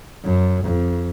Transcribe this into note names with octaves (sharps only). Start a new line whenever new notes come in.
F#2
F2